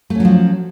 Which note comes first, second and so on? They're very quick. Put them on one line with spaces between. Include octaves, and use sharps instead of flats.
A3 C#4 F#3 F3